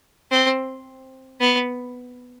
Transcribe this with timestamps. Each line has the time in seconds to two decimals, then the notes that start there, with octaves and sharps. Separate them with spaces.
0.31 C4
1.40 B3